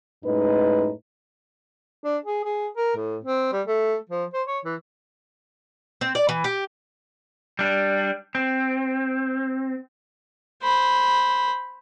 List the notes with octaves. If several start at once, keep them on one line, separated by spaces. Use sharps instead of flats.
F#2 A2 G#3 D#4 B4
D4
G#4
G#4
A#4
A2
C4
G3
A3
F3
C5
C#5
E3
C4
D5
E3
G4
G3 D4
C4
C5 B5